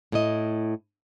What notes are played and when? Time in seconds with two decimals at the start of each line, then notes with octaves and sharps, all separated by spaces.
0.12 A2 E4 D#5